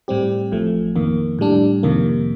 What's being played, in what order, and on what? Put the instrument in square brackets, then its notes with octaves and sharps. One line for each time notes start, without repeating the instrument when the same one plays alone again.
[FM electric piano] A2 G3 C4 G4
A1 A2 F3 A3
F2 D#3 A#3
A2 G3 D4
F2 C3 D#3 A#3